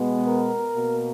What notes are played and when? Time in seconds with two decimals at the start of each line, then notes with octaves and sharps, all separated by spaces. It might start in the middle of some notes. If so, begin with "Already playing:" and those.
Already playing: B2 G#3 B3
0.26 A#4
0.73 B2 A#3